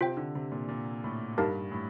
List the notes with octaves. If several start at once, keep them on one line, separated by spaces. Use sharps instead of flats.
C3 F4 C5 G5
D3
C3
A#2
A#2
A2
G2 D#4 G4 A#4 F5 A5
A2